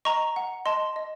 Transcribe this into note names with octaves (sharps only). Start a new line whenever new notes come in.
D#5 A#5 C#6
F#5
D#5 A5 C6
D#5